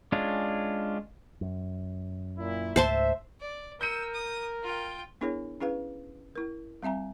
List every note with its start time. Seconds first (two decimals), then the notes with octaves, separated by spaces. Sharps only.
0.12 G#3 C#4 D4 F4
1.41 F#2
2.38 A#2 E4
2.76 C#2 G#2 A3 C5 E5 A5 C6
3.40 D5
3.81 A#4 E6 G6 C#7 D#7
4.14 D#6
4.63 F4 G5
5.21 B3 D4 E4 G#4 A#4 C#5
5.60 C#4 E4 G#4 B4 F5
6.35 E4 A#4
6.82 G3 C4 E5 G#5 A#5